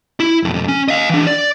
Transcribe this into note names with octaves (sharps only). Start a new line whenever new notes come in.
E4
B1 F2
C#4
D#5 F5
E3 D4
D5